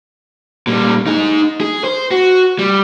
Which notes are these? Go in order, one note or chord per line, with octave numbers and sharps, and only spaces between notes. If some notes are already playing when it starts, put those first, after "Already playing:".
A#2 G3
D#4 G#4
G#4
C5
F#4
G3